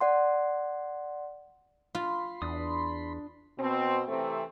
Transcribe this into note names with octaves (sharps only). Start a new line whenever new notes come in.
D5 F#5 C6
F4 B5 C6
E2 D4 D#6
B2 C4
C3 E3 A3 C4